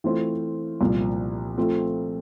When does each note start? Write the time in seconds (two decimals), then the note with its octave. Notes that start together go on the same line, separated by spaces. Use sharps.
0.04 E3 A3 C4 F4 C5
0.81 C2 A#2 F3
1.57 F3 A3 C4 F4 A4